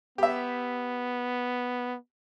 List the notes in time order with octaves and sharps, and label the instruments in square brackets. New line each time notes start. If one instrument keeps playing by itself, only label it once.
[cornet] B3 [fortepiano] G4 E5